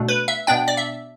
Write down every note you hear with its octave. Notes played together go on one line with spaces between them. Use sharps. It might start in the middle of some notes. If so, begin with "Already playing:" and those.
Already playing: B2 A3 D4
B4
E5
B2 B3 D4 G5
D5
E5